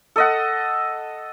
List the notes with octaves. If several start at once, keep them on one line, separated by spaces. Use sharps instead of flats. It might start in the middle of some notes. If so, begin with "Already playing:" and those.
A4 D#5 F#5